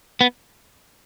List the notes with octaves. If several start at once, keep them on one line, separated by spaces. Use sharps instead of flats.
B3